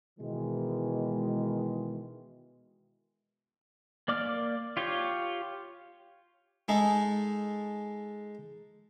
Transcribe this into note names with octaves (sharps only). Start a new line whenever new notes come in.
B2 D#3 E3 G#3
A#3 D5 D6 F6
F4 G4 C#5
G#3 D#4 G#4 A4